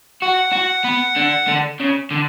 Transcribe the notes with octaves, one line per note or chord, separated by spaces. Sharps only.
F#4 F#5
F#4
B3
D3
D3
C#3
D3